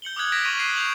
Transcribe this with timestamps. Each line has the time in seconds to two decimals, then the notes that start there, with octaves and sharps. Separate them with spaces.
0.02 G6 C#7 F#7 G7
0.16 D6 D#6 F6 F#6 G#6 F#7
0.32 G#6 A#6 B6 D7 E7 F7
0.44 C#6 G#6 A#6 D7 D#7 F7
0.59 F#6 B6 C7 D7 F#7
0.76 G6 F7 F#7